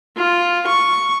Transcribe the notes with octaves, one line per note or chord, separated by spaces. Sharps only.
F4
C#6